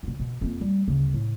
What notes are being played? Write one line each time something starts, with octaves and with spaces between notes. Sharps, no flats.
D2 B2
B2
F2 A#3
G3 A3
D2 C#3
A2